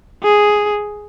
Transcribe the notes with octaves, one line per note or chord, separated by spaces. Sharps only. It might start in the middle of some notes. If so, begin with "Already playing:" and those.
G#4